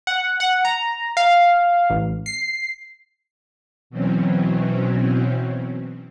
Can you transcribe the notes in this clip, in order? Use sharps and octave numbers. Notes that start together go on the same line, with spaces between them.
F#5
F#5
A#5
F5
A1
C7
B2 E3 F#3 C4 C#4